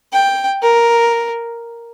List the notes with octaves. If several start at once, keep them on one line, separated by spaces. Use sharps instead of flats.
G5
A#4